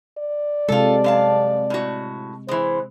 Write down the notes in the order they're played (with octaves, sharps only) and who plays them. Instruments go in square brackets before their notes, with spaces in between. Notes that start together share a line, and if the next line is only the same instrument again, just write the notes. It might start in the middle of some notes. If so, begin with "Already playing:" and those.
[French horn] D5
[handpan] C3 G#3 [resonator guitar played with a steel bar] F4 A4
[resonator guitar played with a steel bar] F#2 F5 A5
A2 F#4
[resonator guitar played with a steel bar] E3 G#3 [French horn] C5